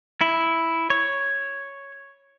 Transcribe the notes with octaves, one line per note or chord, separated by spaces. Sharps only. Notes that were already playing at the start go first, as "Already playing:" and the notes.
E4
C#5